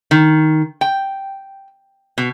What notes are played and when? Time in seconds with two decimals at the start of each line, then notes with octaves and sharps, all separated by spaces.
0.11 D#3
0.81 G5
2.18 B2